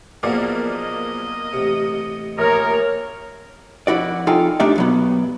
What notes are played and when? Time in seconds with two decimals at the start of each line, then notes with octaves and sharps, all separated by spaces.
0.23 B1 F3 A#3 B3 G#4 D5
0.74 D#5
1.53 A1 C3
2.38 A#1 A#4 C#5
3.87 F2 E4 F#4 D5
4.27 F2 D#4 F4 A4 G5 G#5
4.60 A3 D4 D#4 G4 D5 E5
4.76 B1 F#3 B3